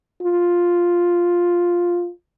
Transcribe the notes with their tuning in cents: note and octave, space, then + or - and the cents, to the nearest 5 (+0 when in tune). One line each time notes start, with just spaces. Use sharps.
F4 +5